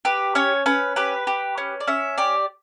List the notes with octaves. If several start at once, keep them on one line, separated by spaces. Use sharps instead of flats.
G4 B4
C#4 C#5
C#4 B4
G4 B4
G4
C#4
D5
C#4 E5
G4 D5